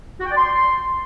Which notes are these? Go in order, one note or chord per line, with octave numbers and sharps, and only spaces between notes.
F#4
G5
D5
C6